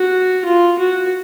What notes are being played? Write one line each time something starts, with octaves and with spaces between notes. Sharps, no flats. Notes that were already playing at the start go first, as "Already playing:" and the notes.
Already playing: F#4
F4
F#4